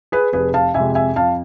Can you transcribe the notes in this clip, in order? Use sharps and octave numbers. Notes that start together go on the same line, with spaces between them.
G#4 B4
F1 G#4 B4
F5 A5
F2 C3 G#3 E5 G#5
E5 G#5
F2 F5 A5